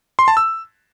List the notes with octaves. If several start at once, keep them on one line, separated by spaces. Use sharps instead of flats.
C6
A5
E6